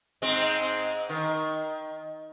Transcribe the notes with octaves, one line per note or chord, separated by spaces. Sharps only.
G#2 G#3 C4
D#3